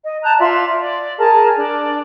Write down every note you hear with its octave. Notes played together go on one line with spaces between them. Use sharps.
D#5
A5 A#5 F#6 G6
F4 D5 E5 C6
D5
G#4 A#4 A5
D4 D5